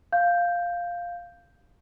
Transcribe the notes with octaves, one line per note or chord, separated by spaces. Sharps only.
F5 G6